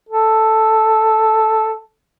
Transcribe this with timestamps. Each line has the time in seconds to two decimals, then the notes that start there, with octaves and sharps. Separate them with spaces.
0.09 A4